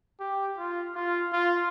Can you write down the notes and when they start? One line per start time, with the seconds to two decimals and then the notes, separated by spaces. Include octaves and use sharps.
0.20 G4
0.58 F4
0.95 F4
1.33 F4